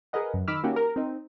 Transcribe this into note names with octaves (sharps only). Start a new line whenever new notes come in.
G#4 A#4 B4 D#5 F#5
F#2
D#3 B5 D6 E6 F6
A#3 C#4 D#4 F#4 G4
A#4
C4 D#4